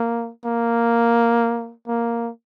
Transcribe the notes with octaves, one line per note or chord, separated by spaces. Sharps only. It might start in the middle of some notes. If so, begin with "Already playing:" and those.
Already playing: A#3
A#3
A#3